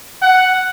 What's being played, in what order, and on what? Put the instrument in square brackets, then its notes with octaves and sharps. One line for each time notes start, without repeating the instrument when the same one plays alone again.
[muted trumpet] F#5